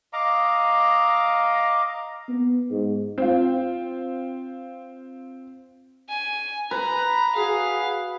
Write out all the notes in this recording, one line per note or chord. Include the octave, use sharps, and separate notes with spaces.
D#5 F5 A#5 D6
B3
G#2
C4 F4
G#5
B4 A#5
F#4 G#4 F5